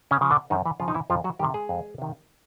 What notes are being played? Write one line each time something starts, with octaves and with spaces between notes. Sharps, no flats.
C#3 C#4
C#3 F3
D3 D4
F#2 D#3 D#4
E3 E4
C#3 F3 F4
D#4
E3 E4
F2 F3 F4
F#3 F#4
C3 D#3 G3 G4
G#3 G#4
F2
C3 D#3